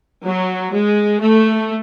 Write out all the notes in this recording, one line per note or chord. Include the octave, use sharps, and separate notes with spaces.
F#3
G#3
A3